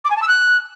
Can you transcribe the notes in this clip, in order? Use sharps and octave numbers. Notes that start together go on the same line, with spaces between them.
D6
G#5
A5
E6
F#6